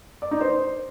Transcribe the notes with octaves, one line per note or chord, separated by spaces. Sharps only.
D5
D#4
C5